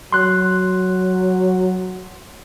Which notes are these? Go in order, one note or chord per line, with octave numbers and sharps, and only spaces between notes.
F#3 C6 F#6